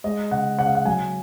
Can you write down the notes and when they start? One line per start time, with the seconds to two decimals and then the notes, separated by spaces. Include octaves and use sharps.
0.04 G#3 D#5
0.31 C#3 F#5
0.59 C#3 F#5
0.67 F5
0.75 F#5
0.85 F#3 G#5